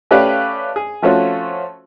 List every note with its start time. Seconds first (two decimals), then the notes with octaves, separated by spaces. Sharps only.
0.11 A3 C#4 G4 B4 D5 F5
0.76 G#4
1.02 F3 A3 C4 C#4 F4 F#4